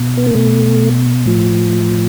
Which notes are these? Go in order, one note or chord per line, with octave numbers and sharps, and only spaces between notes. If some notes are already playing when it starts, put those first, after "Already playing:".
Already playing: B2
B3
A#3
B2 A3
A2 F3